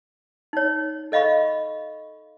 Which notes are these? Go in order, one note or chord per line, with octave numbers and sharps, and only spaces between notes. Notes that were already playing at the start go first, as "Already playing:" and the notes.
D#4 C#5
A4 D#5 F5 B5 C#6